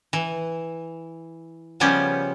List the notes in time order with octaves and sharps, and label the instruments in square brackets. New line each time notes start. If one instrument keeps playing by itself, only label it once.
[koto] E3
C#3 F3 G3 B3 C#4 G4